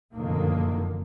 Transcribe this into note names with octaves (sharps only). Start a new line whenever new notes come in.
F1 F#2 A#2 D3 D#3 A#3